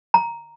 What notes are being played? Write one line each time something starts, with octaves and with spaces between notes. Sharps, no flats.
A#5